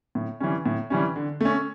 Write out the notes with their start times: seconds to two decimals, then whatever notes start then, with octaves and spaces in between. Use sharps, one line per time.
0.15 A2
0.40 E3 G3 C#4
0.66 A2
0.90 E3 G3 C#4
1.16 D3
1.41 A3 C#4